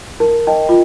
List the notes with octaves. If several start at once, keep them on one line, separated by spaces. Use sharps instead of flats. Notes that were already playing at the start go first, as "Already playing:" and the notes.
D#4 A#4
D#4 D#5 G5
F4